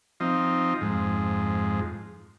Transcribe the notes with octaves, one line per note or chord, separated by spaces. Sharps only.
F3 C4 D#4
F2 G#2